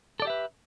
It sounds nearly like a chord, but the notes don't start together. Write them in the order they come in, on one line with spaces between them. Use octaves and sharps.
A4 D5 G4 E5 B4